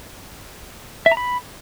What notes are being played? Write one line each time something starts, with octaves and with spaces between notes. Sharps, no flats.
E5
A#5
B5